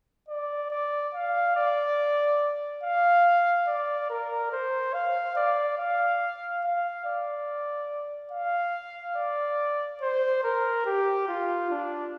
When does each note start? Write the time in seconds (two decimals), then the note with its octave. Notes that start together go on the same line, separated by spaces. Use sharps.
0.29 D5
0.71 D5
1.14 F5
1.56 D5
2.83 F5
3.67 D5
4.10 A#4
4.52 C5
4.94 F5
5.36 D5
5.79 F5
6.63 F5
7.05 D5
8.32 F5
9.16 D5
10.01 C5
10.44 A#4
10.86 G4
11.29 F4
11.71 D4